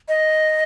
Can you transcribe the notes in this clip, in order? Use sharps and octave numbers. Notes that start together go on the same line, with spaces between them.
D#5